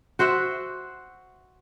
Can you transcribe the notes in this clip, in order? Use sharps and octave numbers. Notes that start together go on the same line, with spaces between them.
F#4 C5 E5 F#5